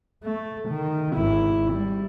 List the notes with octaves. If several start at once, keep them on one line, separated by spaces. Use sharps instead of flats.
A3
D#3
G#1 E4
G3